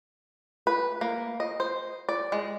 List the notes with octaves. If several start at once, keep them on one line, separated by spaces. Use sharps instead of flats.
B4
A#3
D#5
C5
D5
G#3